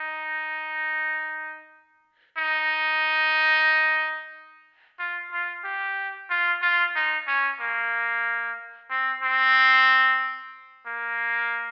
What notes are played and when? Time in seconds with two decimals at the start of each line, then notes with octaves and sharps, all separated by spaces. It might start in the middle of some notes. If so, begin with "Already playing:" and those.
Already playing: D#4
2.37 D#4
4.99 F4
5.31 F4
5.64 G4
6.30 F4
6.62 F4
6.95 D#4
7.27 C#4
7.60 A#3
8.90 C4
9.23 C4
10.86 A#3